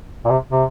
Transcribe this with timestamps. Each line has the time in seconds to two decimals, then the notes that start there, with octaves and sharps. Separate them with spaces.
0.25 A#2
0.30 C3
0.51 C3